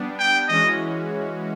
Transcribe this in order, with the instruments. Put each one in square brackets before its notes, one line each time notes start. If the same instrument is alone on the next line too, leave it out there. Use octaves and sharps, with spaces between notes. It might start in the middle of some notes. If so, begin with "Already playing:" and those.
Already playing: [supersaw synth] G3 B3 D4
[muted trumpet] G5
[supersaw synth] E3 G#3 C#4 F#4 [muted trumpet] D#5